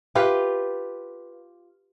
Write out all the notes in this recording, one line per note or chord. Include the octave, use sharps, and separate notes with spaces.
F4 G4 B4 F5